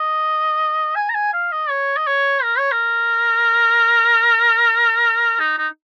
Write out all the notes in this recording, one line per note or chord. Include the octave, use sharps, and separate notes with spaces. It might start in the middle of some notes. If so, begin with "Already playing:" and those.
Already playing: D#5
G#5
A#5
G#5
F5
D#5
C#5
D#5
C#5
A#4
C#5
A#4
D#4
D#4